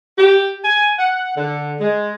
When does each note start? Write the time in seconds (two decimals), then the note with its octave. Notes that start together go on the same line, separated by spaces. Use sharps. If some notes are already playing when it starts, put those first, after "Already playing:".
0.18 G4
0.63 G#5
0.98 F#5
1.36 D3
1.80 G#3